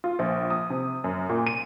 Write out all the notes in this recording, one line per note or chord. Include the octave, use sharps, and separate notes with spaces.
F4
A#1
D#6
C3
F#2
A#2
D#7